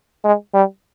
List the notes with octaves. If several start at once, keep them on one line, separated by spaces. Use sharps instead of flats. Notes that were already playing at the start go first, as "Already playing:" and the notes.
G#3
G3